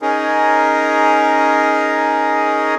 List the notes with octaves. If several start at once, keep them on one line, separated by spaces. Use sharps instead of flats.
C#4 D#4 G#4 A#4